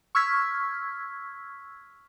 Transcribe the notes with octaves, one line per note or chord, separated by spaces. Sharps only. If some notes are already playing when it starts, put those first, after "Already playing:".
C#6 E6 F6 G#6 B6